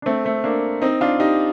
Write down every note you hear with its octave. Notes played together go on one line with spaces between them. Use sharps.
D4
A3 C4
A3 C4
A#3 D4
C4 D#4
D4 F4
D#4 G4